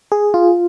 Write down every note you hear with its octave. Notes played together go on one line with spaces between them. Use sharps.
G#4
F4